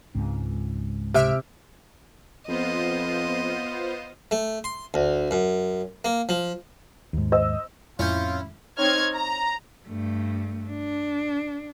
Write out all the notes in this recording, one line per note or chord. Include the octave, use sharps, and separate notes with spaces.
C#2 G#2 C4
C3 E5 F6 D7
F2 B3 F4 C5 D#5
A3
C6
D2
F#2
A#3
F3
D#2 G#2
C5 D#5 E6
F2 A2 C#4 E4 F4 G6
C4 D#4 C#5 F6 G#6
A#5
G2 A3
D4